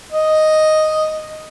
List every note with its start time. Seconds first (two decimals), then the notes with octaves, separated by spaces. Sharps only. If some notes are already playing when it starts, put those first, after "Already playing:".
0.12 D#5